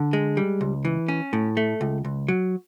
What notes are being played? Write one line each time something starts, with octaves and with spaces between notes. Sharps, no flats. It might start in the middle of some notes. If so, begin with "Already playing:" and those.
Already playing: D3
G#3
G3
C#2
E3
C#4
A2
A3
C#2
C#2
F#3